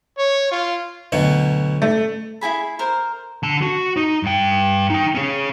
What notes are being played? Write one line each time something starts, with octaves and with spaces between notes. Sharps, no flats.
C#5
F4
D2 B2 F#3
A3
E4 F4 G#4 B5
A#4 C5
D3 A5
F#4
D#4
G2 G5
D#4 G5
C#4 G#4